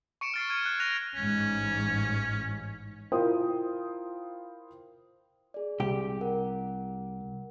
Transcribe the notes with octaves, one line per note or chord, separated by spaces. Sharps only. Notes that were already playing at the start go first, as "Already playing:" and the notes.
C#6 C#7 D7 E7
F6 A6 C7
F6 G#6 D#7
F#6
F#6 G#6 A#6 D#7 F7
A1 G#2 C#4
E4 F4 A#4 C5 G5 D#6
G#4 D5
C2 G4
A#4 F#5